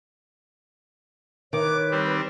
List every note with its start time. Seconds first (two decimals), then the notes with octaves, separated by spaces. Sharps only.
1.53 D#3 B4 C#5 D6
1.91 G3 C4